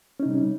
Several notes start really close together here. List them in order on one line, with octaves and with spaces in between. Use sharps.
C#4 D#4 C3 G3